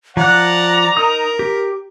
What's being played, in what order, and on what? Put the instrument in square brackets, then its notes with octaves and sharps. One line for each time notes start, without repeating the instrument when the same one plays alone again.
[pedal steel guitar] F3 F#6 [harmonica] D5 F#5 [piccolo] A#5
[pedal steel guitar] D#4 D#6 [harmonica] A#4
[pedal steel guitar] G4